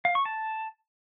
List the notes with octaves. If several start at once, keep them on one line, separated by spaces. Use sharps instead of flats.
F5
C#6
A5